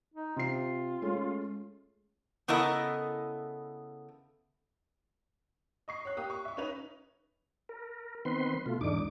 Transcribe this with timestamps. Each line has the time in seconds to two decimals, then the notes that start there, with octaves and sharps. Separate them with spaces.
0.14 D#4
0.36 C3 F4 C7
1.02 G#3 A3 C#4
2.48 C#3 B3 E4 A4 A#4 D#5
5.88 D#5 C#6 C7
6.05 C#5 F#6
6.17 A#3 G4 D#6
6.30 C#6
6.45 E5 C#6
6.57 C#4 D#4 B4 F7
7.69 A#4
8.25 D#3 B3 C4 B4 C6
8.66 B2 A3 F4
8.81 E2 G#2 D3 D4 D#4 D6